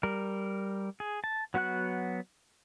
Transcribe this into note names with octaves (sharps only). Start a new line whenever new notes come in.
G3 A#4
G#4
A5
F#3 B3 F#4 F#5 F#6